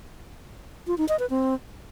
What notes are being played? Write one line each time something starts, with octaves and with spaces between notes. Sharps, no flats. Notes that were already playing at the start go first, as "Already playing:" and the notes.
F4
D#4
D#5
B4
C4